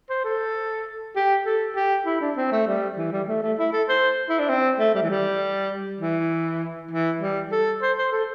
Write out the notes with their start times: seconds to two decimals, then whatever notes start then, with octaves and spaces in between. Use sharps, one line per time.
0.10 C5
0.24 A4
1.15 G4
1.46 A4
1.75 G4
2.06 E4
2.21 D4
2.37 C4
2.52 A3
2.67 G3
2.97 E3
3.12 G3
3.28 A3
3.42 A3
3.58 E4
3.73 A4
3.88 C5
4.29 E4
4.39 D4
4.49 C4
4.79 A3
4.94 G3
5.02 E3
5.09 G3
6.00 E3
6.91 E3
7.21 G3
7.52 A4
7.82 C5
7.98 C5
8.12 A4